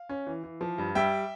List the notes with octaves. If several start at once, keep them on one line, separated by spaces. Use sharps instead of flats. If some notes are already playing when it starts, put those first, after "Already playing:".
Already playing: F5
C#4
E3
E3
F3
G2
G3 E5 G5